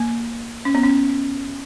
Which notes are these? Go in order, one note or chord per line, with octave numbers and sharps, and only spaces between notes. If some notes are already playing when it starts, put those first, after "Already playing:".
Already playing: A#3
C#4
B3
C#4